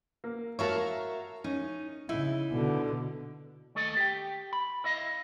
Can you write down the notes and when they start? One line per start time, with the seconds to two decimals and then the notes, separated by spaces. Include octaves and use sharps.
0.24 A#3
0.59 F#4 A#4 C#5 E5 F5 A5
1.44 C#4 D#4
2.09 C#3 D#4 E4
2.51 B2 D3
3.75 D#2 A3 A4 D#5
3.97 G4 G5
4.53 B5
4.84 E4 D#5 F5